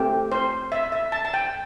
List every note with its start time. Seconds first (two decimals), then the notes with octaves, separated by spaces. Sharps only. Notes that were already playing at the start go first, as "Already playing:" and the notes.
Already playing: A3 C4 G4
0.32 C5
0.72 E5
0.92 E5
1.12 A5
1.25 A5
1.34 G5